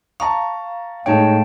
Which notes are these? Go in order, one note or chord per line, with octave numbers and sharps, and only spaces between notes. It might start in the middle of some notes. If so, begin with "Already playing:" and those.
F5 A5 A#5 C#6
A2 G#3 D#4 C#5 G5 A5